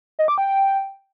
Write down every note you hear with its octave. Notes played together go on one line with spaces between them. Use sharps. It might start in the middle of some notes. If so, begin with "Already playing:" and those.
D#5
D6
G5